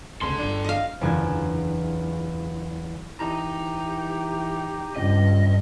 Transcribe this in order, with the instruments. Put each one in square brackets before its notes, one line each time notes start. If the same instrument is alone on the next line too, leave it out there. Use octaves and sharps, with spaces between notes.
[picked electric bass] F1 D2 C#3 [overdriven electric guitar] A4 C6
[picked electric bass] D1 G1 [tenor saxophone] D4
[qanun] D#5 F5
[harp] F#1 E2 D3 G#3 F4 G#5
[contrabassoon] E3 [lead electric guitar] D#4 A#5 [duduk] G4
[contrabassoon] C#2 [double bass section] G2 [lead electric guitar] D#5